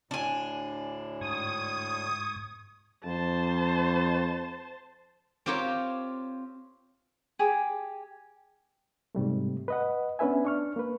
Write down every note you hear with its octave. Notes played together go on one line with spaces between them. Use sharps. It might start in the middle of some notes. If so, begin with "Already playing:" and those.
D2 A2 D4 G#5
G#2 C#6 D#6 G#6
F2 C5 A5
C4 F4 G4 A#4 C#5
G4 G#4
G#2 C3 G3 A3
B4 D#5 F#5
B3 C#4 D4 B4 E5 G#5
D4 C#6 F6
A#3 B4